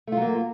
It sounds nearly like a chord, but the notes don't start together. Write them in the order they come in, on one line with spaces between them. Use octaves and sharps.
A3 F4 F#3 A#3